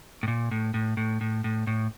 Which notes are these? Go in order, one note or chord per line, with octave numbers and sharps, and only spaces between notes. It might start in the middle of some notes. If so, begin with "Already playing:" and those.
A2
A#2
A2
A2
A2
A2
A2
A2